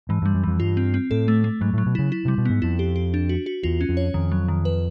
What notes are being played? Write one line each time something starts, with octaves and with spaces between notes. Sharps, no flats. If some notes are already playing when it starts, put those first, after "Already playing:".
G#2 E3
G2 G3
F#2
F2 E3
G2 F4
C4
C4
A2 A4
A3
A3
G#2 F#3
A2
F#3
B2
C#3 E4
E4
C3 G3
B2
G#2 B3
F2 E4
G4
G4
D4
F#4
F#4
E2 F4
C#4
F2
C#5
F2 D#3
F#3
D#3
B4